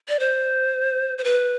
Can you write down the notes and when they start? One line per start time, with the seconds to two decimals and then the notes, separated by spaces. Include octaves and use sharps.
0.09 D5
0.20 C5
1.18 C5
1.24 B4